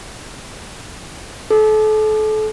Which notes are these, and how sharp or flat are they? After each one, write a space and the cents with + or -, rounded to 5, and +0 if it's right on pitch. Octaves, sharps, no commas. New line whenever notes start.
A4 -35